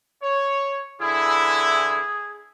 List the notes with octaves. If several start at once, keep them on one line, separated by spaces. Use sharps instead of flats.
C#5
D3 E3 E4 G#4